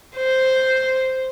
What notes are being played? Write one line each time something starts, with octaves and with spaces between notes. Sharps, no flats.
C5